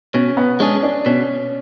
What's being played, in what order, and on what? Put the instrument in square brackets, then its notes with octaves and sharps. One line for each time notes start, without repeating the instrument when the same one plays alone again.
[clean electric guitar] B2 [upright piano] C#4
[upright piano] B3
[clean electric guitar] G#3 D4 G#4 [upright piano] C#4
[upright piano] D4
[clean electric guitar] B2 [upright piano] C#4